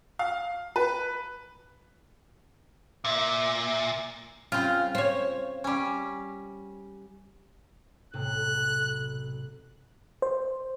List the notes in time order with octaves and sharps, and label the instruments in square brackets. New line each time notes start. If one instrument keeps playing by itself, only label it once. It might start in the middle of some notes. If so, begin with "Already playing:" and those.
[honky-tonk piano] F5
B4
[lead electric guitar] A#2 [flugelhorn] E5
[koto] C#3 C4 [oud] F4
[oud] C5 C#5
[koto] G3 C#4
[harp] B1 A2 C3 [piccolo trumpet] F#6
[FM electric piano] C5